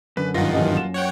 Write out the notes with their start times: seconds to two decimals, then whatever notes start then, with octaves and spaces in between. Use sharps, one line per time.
0.17 F#2 D3 B4
0.34 G2 D#3 D#4 F4 F#5 A#6
0.53 D#1 E3 D#5
0.77 E7
0.94 C#5 F#5 G5